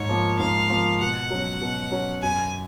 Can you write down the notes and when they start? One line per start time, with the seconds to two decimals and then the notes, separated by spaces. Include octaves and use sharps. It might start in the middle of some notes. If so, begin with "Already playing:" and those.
Already playing: G#2 C#5
0.09 F3 A#3
0.39 G#2 F5
0.70 F3 A#3
1.00 B2 F#5
1.30 F#3 C#4
1.61 B2
1.91 F#3 C#4
2.22 F#2 G#5